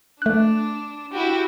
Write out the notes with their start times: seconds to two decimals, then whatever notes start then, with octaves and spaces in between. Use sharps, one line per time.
0.22 A3 D4 F#6
1.12 E4 F#4 G4